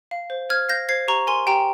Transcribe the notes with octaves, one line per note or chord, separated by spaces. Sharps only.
F5
C5
C5 F6 G#6
F5 G6 A#6
C5 G#6 C7
G4 A#5 C#6
A#4 G#5 C6
G4 G5 A#5